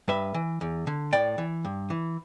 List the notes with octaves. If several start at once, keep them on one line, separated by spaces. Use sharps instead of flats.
G2 B4 E5
E3
E2
D3
A2 D5 G5
E3
G2
E3